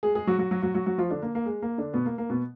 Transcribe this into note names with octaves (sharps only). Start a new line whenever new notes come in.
G#3 G#4
G#3 G#4
F#3 F#4
F#3 F#4
F#3 F#4
F#3 F#4
F#3 F#4
F#3 F#4
F3 F4
D3 D4
A#3
A#3
G#3
A#3
D3 D4
B2 B3
A#3
A#3
B2 B3